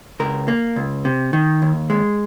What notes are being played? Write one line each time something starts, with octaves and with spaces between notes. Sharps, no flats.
C#2 A#4
A#3
C#2
C3
D#3
D#2
G#3